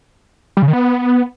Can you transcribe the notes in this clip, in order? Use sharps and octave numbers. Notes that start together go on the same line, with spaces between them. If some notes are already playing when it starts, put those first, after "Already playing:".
G3
C#3
D#3
B3